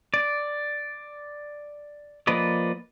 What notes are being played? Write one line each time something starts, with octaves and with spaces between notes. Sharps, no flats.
D5
F3 A#3 B4 D5 D#5